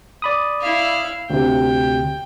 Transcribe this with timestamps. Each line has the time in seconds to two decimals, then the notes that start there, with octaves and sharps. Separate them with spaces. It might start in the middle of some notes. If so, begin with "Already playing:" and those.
0.22 D5 B5 D#6
0.61 E4 F5
1.30 D2 C3 G5